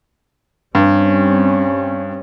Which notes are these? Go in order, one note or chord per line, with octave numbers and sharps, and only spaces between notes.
G2 G3 C4 C#4